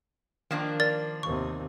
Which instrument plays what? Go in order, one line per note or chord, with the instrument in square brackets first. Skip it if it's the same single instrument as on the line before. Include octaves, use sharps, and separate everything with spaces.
[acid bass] D#3 [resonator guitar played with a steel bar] F3 A#3 D4
[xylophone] A#4 D5 A6
[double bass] D#2 C3 [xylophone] C#6